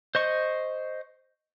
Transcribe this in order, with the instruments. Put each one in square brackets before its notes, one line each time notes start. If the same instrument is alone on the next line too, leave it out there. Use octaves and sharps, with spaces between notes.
[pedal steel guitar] C5 D#5 C#6